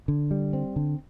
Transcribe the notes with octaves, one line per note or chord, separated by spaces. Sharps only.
D3
G3
C4
D3